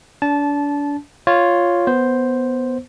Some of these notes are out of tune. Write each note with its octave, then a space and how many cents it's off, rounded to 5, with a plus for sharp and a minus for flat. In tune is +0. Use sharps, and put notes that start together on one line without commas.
D4 -35 A5 -20
F4 +0 C#5 +0
B3 +0 C5 +0